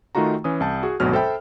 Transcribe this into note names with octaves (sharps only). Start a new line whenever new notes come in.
D#3 A3 D#4 F4 F#4 A#5
E3 C#4 D#6
C2 A5 G6
F#4 G#4
G#1 D2 B2 F#3 F6
A4 C5 E5 G5 B5